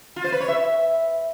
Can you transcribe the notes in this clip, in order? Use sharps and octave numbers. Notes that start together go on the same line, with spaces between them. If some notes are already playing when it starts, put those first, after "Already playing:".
F4
C5
B4
C#5
E5